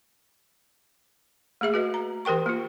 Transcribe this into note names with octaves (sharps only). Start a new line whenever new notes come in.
A3 A#3 G#4 E5
F#4 B4 D#5
A#5
E3 G4 A#4 G5 C#6
A#3 F4